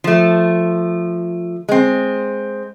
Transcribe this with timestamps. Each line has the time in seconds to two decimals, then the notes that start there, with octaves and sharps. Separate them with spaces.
0.04 F3 A3
1.69 G#3 C4